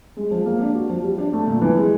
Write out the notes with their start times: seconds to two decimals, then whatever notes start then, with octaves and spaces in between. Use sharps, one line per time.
0.17 G#3
0.31 F3
0.46 A#3
0.61 D4
0.75 F#4
0.89 F3
1.04 G3
1.18 D4
1.33 A3
1.47 A#2
1.61 E3
1.77 G#3